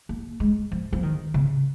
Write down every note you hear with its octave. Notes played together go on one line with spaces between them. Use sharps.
A#3
G#3
F3
F3
D#3
C#3